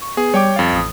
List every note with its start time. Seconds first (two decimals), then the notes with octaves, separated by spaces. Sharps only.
0.01 C#6
0.17 B3 G#4
0.34 G3 C#5 G5 D6
0.56 F2 F5 A6
0.73 A1 D#6